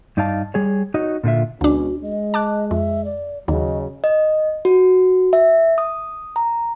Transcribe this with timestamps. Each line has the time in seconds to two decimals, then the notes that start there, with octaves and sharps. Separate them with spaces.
0.17 G2 D#4 D5 F5 A5
0.54 G3 G#4 C#5
0.94 D#4 F#4 C#5 D#5
1.24 A#2 D3 F4 E5
1.61 D2 B2 G#3 C#4 D4 F#4
2.03 G#3 D#5
2.34 A5 D6 F#6
2.71 F2 E5
3.05 D5
3.48 D#2 C#3 F#3 D#5
4.04 D#5
4.65 F#4
5.33 E5
5.78 D#6
6.36 A#5